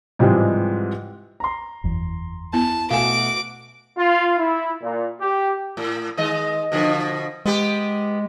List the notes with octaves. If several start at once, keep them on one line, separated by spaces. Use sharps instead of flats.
G#2 C3 E3 F3 G3 G#3
A#5 C6
F#1 E2
B3 E4 A5
B2 A3 F#4 F5 G#5 D6 E7
F4
E4
A#2
G4
A2
D#3 G#3 D#5
B2 D3 F3
G#3 B3 G4